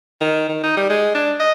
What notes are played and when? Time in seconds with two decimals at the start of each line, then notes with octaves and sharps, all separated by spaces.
0.21 D#3
0.49 D#3
0.64 D#4
0.77 G3
0.90 G#3
1.15 D4
1.40 D#5